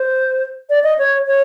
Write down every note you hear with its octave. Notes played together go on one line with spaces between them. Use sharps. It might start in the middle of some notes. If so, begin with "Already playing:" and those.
Already playing: C5
D5
D#5
C#5
C#5